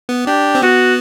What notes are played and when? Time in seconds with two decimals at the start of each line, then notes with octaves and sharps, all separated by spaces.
0.09 B3
0.27 D4 G4
0.55 C4
0.62 B3 F#4